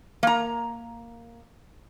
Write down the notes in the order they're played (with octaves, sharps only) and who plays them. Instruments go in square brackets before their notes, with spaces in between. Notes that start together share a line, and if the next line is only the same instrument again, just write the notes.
[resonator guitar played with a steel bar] A#3 A#5